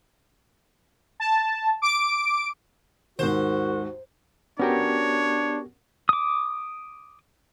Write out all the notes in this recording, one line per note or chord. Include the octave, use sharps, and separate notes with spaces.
A5
D6 D7
D#2 G#2 F#4 A#4 C5
B3 C#4 D4 F#4 G4 A#4 C#5
D6 D#6